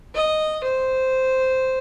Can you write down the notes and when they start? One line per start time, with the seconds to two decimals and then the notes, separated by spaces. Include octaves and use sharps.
0.15 D#5
0.64 C5